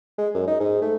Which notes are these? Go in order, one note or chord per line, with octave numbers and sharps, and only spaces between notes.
G#3
F#2
D#4
G#2
A3